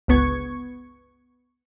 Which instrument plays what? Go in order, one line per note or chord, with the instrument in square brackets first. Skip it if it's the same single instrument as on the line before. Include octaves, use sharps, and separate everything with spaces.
[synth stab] G1 C#2 B3 C#6 G#6